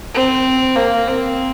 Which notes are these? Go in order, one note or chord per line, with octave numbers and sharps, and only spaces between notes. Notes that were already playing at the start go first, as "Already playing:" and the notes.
C4
A#3
C4